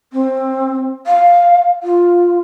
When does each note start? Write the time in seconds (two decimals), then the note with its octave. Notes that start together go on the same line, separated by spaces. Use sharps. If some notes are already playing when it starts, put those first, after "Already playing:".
0.13 C4
1.07 F5
1.83 F4